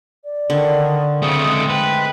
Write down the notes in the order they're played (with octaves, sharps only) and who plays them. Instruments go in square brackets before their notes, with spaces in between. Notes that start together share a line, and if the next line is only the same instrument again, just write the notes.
[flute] D5
[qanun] D3 [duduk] D#3
[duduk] C#3 [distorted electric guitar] A3 C4 [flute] D#6
[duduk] G#3
[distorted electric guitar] B4 [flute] G5